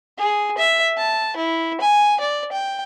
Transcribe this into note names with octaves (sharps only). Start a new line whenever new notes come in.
G#4
E5
A5
E4
G#5
D5
G5